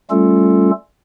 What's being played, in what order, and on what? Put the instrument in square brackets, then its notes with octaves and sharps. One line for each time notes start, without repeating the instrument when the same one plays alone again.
[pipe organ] G3 A3 C#4 F4 A4